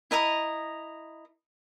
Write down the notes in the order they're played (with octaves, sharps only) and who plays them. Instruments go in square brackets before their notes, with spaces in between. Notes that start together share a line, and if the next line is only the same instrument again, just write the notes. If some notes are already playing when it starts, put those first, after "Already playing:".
[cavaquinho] E4 D#5 A#5 D#6